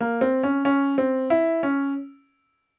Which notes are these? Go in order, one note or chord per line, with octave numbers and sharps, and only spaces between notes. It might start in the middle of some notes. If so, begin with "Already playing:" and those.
A#3
C4
C#4
C#4
C4
E4
C#4